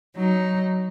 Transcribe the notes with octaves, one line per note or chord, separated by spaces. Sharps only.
F#3 D#4